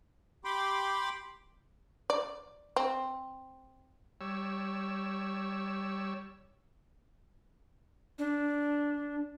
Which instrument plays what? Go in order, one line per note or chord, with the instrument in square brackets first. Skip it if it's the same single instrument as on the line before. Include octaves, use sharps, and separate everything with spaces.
[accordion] G4 G5 B5 C6 D6
[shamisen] D5
C4
[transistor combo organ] G3 C#5 E6
[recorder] D4